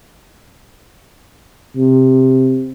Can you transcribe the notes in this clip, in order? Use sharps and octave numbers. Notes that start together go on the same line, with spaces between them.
C3